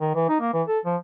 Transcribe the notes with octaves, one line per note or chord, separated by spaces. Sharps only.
D#3
E3
D#4
A#3
E3
A4
F3